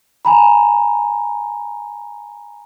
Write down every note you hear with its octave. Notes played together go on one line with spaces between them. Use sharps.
G#5 A#5 B5